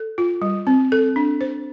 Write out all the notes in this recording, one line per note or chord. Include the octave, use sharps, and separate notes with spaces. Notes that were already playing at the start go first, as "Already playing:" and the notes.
Already playing: A4
F4
G3
C4
A4
D4
C5